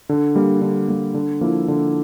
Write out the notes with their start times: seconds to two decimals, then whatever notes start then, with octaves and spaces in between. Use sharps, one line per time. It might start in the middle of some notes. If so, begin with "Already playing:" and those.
0.09 D3
0.36 G3 A#3
0.61 D3
0.88 G3 A#3
1.14 D3
1.41 F3 A#3 E4
1.68 D3